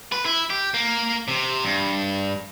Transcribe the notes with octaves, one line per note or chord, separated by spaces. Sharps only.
B4
E4
G4
A#3
C3
G2